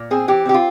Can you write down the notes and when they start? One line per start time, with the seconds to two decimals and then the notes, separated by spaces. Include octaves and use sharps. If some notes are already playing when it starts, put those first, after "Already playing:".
Already playing: A#2
0.11 C4 G#4
0.28 E3 G4
0.45 C4 G4
0.54 F4